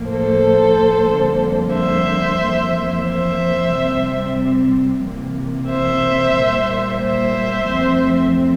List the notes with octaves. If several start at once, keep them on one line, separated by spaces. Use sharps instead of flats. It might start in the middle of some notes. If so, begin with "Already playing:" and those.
Already playing: A2 F3 A#3
A4 C5
F2 D3 G3 A#3
C5 E5
F2 E3 A#3
C5 E5
C3 G3 C4
C3 E3 A#3
C5 E5
A#2 G3 A#3
C5 E5
F2 E3 A3 C4